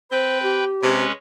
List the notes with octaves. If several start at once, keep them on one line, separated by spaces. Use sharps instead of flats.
C4 B4 C5 G5
G4
C3 G#3 C#4 B4